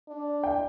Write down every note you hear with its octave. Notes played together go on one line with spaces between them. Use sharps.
D4
G5